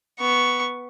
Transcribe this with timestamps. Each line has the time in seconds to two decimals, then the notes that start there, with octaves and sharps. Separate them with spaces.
0.20 B3 C#6